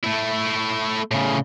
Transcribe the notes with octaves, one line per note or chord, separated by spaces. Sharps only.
A3 E4
A2 C#3